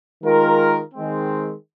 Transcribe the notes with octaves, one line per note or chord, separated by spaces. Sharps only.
D#3 G#3 F4 A#4
D#3 G#3 C4